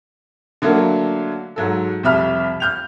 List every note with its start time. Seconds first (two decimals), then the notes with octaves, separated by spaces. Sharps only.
0.62 D3 F#3 A3 A#3
1.56 G#2 F#3 A4
2.03 C2 F2 E5 B5 F6
2.60 F6 G6 F7